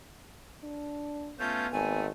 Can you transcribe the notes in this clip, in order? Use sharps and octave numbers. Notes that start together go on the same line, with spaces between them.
D4
A3 B3 C#4 F4 G6
G#1 A3 G#5